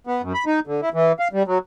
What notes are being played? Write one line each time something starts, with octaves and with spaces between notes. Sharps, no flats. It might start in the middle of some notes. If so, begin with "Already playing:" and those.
B3
F#2
B5
D#4
D3
E4
E3
F5
G3
F#3